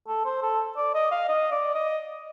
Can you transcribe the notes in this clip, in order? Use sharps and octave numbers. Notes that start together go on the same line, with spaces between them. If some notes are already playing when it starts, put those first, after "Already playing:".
A4
C5
A4
D5
D#5
F5
D#5
D5
D#5